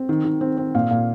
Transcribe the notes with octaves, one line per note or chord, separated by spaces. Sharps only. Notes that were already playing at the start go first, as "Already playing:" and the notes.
Already playing: C4
D#3
D#3
C4
C4
A#2 F5
A#2